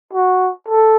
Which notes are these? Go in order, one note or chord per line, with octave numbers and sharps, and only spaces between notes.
F#4
A4